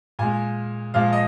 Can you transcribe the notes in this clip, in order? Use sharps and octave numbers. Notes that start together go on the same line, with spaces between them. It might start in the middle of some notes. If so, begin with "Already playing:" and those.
A#2 G#3 G#5
A#2 F3 G#3 F5
D#5